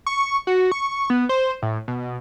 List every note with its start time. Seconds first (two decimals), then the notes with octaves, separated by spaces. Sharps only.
0.06 C#6
0.47 F#4
0.72 C#6
1.10 B3
1.29 C5
1.62 A2
1.88 B2